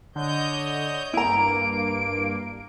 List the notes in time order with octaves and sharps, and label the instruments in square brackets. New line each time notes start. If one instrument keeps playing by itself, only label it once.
[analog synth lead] D3 [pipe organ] C#5 D#5 G6
[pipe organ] G2 A#3 [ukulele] E4 A#5 [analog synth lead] D7